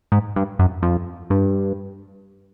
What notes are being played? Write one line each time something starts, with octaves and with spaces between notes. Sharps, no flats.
G#2
G2
F#2
F2
G2